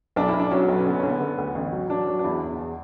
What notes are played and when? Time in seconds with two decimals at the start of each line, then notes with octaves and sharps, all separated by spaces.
0.16 B1 D4
0.28 E4
0.33 B1
0.40 D4
0.51 F#3 C#4
0.68 B1 B3
0.79 C#4
0.86 D3 B3
1.00 D3 C#4
1.09 B3
1.21 D3
1.38 D2
1.55 A1
1.72 F#3
1.90 F#3 D4
2.07 F#3
2.19 D4
2.24 E2 E4
2.41 E2
2.59 E2